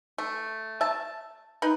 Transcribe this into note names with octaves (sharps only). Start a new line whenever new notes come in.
A3
E5 A5
D#4 B4